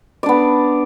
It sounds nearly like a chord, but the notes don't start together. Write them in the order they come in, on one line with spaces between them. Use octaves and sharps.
D5 D4 B3